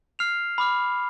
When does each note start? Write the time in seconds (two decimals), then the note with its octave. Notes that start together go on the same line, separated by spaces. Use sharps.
0.19 F6 C7 F7
0.58 B5 D6 F6